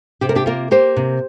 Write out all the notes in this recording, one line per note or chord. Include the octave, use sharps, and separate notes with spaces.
C3 G4
A#4
D4 G4
A#3 F4 A#4
A#3 G4 C5
C3